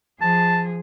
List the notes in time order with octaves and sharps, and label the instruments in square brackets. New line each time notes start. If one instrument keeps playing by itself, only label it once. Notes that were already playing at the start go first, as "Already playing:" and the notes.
[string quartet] F3 G#4 [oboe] A5